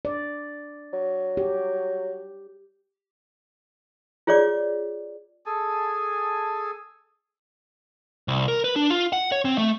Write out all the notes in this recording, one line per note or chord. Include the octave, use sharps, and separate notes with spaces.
D5
F#3
G4
F4 G#4 C#5 D5 D6
G#4 A4 G#5 A5
C2
A#4
B4
D4
F4
F#5
C#5
C4
A3